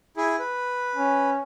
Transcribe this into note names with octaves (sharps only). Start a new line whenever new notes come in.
E4 G#4
B4
C#4